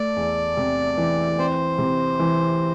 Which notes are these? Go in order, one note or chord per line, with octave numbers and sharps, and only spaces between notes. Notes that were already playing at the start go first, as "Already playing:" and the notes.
Already playing: A3 D5
E2
C3
E3
C4 C5
C3
E3